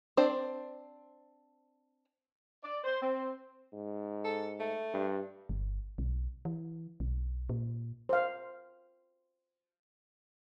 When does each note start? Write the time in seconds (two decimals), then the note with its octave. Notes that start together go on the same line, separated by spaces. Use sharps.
0.17 C4 D4 C5 D5
2.63 D5
2.84 C5
3.01 C4
3.73 G#2
4.24 A4
4.60 A3
4.94 G2
5.49 G1
5.98 B1
6.45 E3
7.00 B1
7.49 A#2
8.09 C5 F5